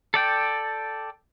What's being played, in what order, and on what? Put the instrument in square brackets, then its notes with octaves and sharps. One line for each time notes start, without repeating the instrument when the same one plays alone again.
[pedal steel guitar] A4 D5 G5